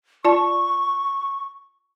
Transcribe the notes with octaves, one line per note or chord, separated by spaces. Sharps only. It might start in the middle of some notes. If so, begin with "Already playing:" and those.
F4 D5 A5 C#6